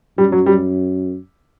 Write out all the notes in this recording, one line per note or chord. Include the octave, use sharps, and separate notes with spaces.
F#2 G3
F#3
G3